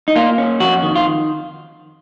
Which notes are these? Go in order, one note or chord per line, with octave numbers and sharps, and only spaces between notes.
D#4
A#3 F4
C#4
F2 F#4
D#3
F4